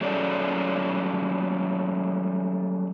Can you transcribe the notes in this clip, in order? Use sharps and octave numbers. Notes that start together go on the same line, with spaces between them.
F#3 G3 A3 C#4 G#4 D5